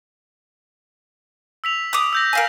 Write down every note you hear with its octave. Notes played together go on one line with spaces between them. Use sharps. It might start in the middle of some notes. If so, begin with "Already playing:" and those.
E6 B6 F7
D6 D#6
E6 G6 A#6
A#4 F5 G#5